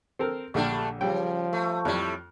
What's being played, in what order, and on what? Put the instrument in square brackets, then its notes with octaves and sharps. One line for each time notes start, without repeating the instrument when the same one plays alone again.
[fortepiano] C4 A4 A#4
[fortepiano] A#1 D3 G4 [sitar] G3 A3 D4
[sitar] C#3 [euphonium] F3 [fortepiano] G3 G5
[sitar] A3
[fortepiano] F2 [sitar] A2 G3